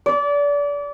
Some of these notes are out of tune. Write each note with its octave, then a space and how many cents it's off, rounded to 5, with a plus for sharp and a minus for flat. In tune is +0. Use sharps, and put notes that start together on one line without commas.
D5 -30